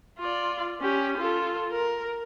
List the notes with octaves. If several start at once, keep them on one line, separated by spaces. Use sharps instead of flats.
F4 D5
C#4 G4
F4 A4
A#4